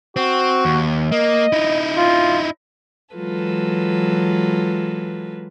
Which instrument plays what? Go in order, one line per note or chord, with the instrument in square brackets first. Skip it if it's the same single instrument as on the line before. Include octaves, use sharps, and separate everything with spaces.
[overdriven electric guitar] C4 [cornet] F#4
[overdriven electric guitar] D#2
[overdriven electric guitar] A#3 [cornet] D#5
[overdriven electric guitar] D#4 E4
[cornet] F4
[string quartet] E3 F#3 G#3 F4 A4 B4